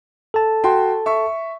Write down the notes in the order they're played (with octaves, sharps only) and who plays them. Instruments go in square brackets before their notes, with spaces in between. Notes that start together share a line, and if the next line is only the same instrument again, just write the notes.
[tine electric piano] A4 A5
[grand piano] F#4 G5 C6
E5 C#6